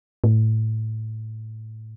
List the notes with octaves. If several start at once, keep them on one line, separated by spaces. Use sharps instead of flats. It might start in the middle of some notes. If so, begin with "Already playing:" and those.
A2